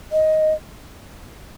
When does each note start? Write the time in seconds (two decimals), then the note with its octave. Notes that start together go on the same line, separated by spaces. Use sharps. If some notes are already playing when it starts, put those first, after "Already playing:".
0.12 D#5